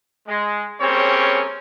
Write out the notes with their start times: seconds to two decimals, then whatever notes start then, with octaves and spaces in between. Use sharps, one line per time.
0.28 G#3
0.80 G3 A#3 C4 C#4 G#4 C#5